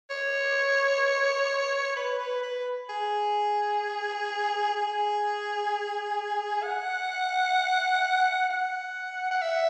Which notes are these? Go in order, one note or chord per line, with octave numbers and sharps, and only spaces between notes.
C#5
B4
B4
B4
G#4
G#4
F#5
F#5
F#5
E5